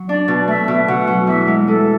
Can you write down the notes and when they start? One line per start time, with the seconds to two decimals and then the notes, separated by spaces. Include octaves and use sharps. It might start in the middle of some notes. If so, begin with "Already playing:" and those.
Already playing: F#3
0.09 D4 D5
0.28 B2
0.48 A3 E5
0.68 B2
0.88 B2 F#5
1.07 F#3
1.27 E2 E5
1.47 G#3
1.67 G#3 A4